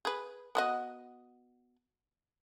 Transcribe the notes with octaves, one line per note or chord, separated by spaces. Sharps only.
G#4 B4
B3 F#4 D#5